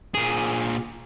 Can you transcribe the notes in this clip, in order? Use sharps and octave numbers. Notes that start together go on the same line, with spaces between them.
A#2 G#4